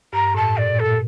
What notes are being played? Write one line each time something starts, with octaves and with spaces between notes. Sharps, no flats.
G2 A#5
A2 A5
A#2 D5
A#2 A4